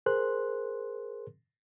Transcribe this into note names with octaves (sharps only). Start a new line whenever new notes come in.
G#4 A#4 C5 C6 F#6